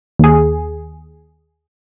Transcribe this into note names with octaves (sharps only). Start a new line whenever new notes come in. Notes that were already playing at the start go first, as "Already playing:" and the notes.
D#2 G#4